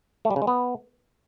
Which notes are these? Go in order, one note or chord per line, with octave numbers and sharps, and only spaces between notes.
A3
G3
C#3
G#3
B3